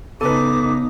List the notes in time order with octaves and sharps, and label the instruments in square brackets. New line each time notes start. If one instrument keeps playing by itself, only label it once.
[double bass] C#3 D#4 [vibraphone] B3 [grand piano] A4 B4 [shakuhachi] D6